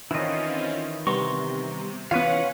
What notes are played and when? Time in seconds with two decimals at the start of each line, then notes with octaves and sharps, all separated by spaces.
0.11 D#3 E3 C4 C#4 E4 F4 D#5
1.07 C3 G3 B3 A#5 C6 C#6
2.11 E3 B3 C#4 F4 B4 C#5 F5 F#5